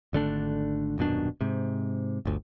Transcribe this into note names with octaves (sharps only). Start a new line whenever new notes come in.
G#1 D3 A3 D4
D#1 F#2 B2 D4
G#2 C3
G1 D2